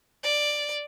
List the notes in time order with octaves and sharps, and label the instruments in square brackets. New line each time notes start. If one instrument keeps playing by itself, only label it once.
[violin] D5